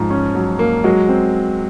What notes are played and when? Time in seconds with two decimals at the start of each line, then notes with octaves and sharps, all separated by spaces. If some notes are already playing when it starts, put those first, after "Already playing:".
Already playing: G#2 F3
0.10 C#4
0.35 F#3
0.59 A#3
0.84 F#3 G#3
1.09 C4